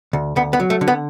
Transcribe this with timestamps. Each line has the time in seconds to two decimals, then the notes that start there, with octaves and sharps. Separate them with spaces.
0.13 D2
0.36 D2 B3
0.53 B3
0.60 F#3
0.70 A3
0.81 D3
0.88 B3